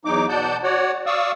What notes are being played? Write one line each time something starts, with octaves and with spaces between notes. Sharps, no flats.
E2 F#3 D#4 D6
B2 D5 F#5 A5 G6
F#4 C#5 D5 F#5
D5 F5 C#6 D#6 E6